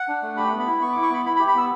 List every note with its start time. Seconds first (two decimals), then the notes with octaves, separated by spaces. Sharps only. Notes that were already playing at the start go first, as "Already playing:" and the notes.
Already playing: F#5
0.08 D4
0.22 A3
0.37 G4 B5
0.52 B3
0.59 B5
0.67 E4
0.81 B3 C#6
0.93 E4 D6
1.03 C#6
1.10 B3 B5
1.25 E4 B5
1.36 B5
1.39 G4
1.48 B5
1.55 B3 E6